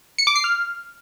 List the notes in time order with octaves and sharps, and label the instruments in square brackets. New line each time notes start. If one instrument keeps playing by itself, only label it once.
[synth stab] C#7
D6
C7
F6